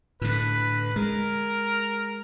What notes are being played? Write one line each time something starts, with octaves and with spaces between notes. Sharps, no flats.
A2 D3 B4
G#3 A#4